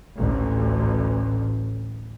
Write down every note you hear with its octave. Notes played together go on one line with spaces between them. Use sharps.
A1 D2